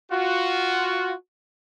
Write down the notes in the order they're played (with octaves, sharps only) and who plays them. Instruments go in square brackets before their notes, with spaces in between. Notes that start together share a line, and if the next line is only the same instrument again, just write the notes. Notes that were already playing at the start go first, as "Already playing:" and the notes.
[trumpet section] F4 F#4